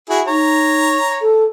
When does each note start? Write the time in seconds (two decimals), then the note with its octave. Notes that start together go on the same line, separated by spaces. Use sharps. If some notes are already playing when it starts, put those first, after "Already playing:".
0.10 E4 F#4 G#4
0.27 D#4 C#5 A#5
1.21 A4